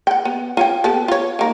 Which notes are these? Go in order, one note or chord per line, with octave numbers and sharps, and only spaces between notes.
F#5 G5
B3
F4 C#5 G5
B3 G4 A4
F4 C#5
D#3 A#3